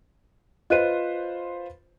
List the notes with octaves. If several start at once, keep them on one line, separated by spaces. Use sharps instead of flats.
F4 B4 C5 D#5 F#6 D#7